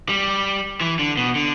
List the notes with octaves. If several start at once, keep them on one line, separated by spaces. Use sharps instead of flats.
G3
E3
D3
B2
D3